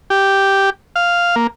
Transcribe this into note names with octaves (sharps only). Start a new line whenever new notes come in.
G4
F5
A#3